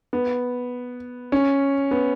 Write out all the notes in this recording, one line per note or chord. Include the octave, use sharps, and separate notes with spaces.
B3
C#4
B3